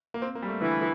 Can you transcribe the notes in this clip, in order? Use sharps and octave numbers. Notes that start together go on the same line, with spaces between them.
A#3
C4
A#3
G3
A3
D3 E3